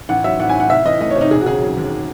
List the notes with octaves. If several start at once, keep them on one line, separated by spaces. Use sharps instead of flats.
A1 F#5
F#3 E5
A1 F#5
G#5
A2
F#5
C2 E5
E3 D#5
A3 D#5
C#5
C3
D#4
E1 G#4
F#4
C#3 G#4
F#3
D#2